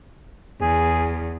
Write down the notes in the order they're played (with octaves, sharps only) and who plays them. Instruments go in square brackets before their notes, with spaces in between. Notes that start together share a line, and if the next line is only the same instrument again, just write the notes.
[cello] E2 [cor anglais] G#4